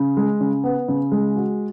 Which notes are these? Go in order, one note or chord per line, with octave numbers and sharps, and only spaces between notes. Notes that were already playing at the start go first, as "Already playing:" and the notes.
Already playing: C#3
G#3
C#3
B3
C#3
G#3
F#4